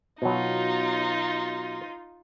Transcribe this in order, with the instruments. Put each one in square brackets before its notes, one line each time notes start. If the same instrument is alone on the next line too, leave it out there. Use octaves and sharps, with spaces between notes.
[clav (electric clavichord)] B2 F#3 [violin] D#4 F4